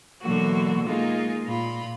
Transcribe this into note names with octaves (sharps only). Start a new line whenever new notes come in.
B2 D3 E3 F#3 A#3 F#4
G#3 A#3 D#4 F4 G#4
A#2 F4 B5